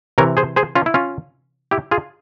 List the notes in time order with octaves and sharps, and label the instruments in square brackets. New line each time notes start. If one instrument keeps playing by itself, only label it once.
[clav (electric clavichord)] C3 E3 A#4 C#5
G#4 C5
G#4 C5
C#4 F4
E4
C#4 F4
E4 G4
F4 G#4